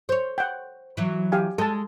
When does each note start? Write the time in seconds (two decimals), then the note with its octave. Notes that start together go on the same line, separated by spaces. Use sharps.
0.09 C5 C#5
0.38 F#5 G5
0.97 E3 F#3
1.32 G4 F5 G#5
1.58 G#3 A4 A5